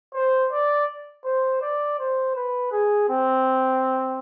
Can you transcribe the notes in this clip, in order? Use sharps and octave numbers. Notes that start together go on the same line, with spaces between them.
C5
D5
C5
D5
C5
B4
G#4
C4